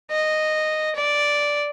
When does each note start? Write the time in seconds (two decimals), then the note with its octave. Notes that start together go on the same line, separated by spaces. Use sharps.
0.11 D#5
0.96 D5